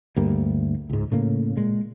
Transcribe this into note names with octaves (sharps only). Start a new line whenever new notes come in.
D2 G2 G3 A#3
C#2 G#2
A2 C#3 A#3
A#2 G#3